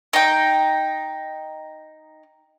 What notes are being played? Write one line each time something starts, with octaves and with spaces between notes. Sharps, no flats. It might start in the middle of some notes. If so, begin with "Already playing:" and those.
D#4 G5